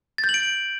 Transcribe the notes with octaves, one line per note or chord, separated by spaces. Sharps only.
A6
G6
F#7
D7